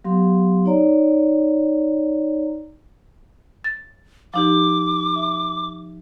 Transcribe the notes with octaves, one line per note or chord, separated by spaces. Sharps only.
F#3 B3 G4 F5 C6
D#4 C#5 D5 A#5
A6
F3 D#4 G4 D6
E5